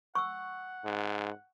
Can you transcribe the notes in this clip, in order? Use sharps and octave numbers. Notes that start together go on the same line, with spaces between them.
F#5 C#6 E6
G#2